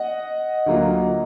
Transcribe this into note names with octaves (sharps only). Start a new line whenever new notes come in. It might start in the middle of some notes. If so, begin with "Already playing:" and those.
Already playing: D#5 F#5
D2 D3 F#3 A#3 F4